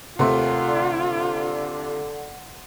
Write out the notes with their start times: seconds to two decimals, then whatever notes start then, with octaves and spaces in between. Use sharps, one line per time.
0.19 D#2 C3 A3 F4 F#5 C6
0.68 D3